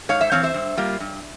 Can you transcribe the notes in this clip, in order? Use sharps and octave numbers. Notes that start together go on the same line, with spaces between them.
G#2 C#5 F5
C5 E5
E3 G#3 C4 C#5 F5
C5 E5
G2
G3 A#3 F4
G2